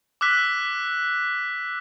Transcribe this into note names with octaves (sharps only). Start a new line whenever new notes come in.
D6 E6 F#6 B6